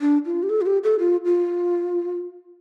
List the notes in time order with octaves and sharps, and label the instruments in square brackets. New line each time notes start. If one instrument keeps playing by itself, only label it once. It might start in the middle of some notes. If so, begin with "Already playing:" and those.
[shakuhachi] D4
F4
G4
A4
F4
G4
A4
F4
F4